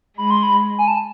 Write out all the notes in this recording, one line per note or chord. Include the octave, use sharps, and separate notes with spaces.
G#3 B5
C6
B5
G#5
A5